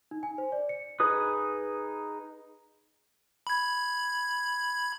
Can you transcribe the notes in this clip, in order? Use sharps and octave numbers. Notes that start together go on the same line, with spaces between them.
D#4
G#5
C5
D5
C#7
D#4 G#4 B4 D#6
B5 G#6